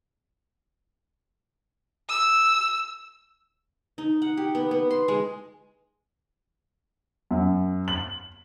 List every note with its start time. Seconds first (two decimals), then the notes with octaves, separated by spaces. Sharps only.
2.09 E6
3.98 D#4
4.22 F#5
4.37 G4
4.55 B3
4.71 B3
4.91 C6
5.08 G#3
7.31 F#2
7.88 F#7